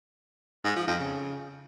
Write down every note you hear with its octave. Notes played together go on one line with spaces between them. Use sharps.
G#2
F3
F2
C#3